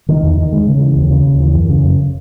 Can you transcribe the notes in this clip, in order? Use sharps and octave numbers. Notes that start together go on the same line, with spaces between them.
D#3
E2
D#3
G#3
C#3
E3
D#2
C#3
D#2
E3
F#2
C#3
F#2